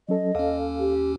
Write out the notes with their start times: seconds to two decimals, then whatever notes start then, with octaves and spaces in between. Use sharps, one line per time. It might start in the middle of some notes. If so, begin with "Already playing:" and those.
0.09 F#3 C#4 A4 D#5
0.35 D#2 C#4 A4 F5
0.79 G4